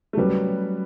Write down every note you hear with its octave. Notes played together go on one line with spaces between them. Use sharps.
A3
F#3 G3 C#4 F#4 B4